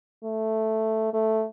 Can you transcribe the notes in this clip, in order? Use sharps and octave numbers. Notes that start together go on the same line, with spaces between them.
A3
A3